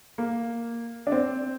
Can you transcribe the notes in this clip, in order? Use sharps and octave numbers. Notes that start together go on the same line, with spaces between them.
A#3
D4
C4